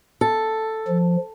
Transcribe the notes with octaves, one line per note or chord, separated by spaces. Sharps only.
A4
F3